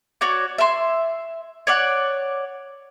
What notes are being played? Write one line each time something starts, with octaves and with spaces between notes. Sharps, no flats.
F#4 C#5 D5
E5 C6
C#5 D5 F#5